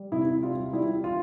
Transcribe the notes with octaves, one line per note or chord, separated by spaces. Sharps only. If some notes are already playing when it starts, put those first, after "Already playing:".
Already playing: G3
C3 E4
G3 F4
G3 E4
F4